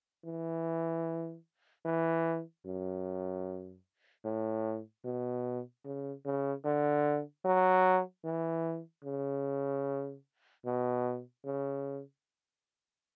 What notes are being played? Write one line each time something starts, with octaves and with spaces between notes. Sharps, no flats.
E3
E3
F#2
A2
B2
C#3
C#3
D3
F#3
E3
C#3
B2
C#3